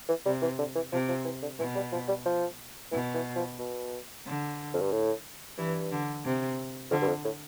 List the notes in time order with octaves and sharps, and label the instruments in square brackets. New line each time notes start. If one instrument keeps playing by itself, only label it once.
[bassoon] E3
[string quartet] C3 [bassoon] G3
[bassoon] E3
D3
E3
[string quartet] C3 [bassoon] F3
[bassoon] F3
E3
D3
[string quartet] B2 [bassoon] E3
[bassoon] G3
F3
G3
F3
[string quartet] B2 [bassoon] E3
[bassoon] E3
F3
B2
[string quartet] D3
[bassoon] F2
G2
A2
[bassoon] G2 [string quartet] E3
[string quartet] D3
C3
[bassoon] F2 [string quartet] D3
[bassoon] G2
F2
A2